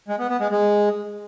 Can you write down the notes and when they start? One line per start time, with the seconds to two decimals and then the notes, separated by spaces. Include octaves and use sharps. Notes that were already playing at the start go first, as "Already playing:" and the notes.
0.08 G#3
0.19 B3
0.30 B3
0.40 G#3
0.51 G#3